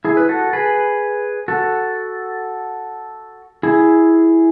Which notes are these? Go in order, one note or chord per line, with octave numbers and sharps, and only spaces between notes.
E4 G#4
B4
F#4 A4
G#4 B4
F#4 A4
E4 G#4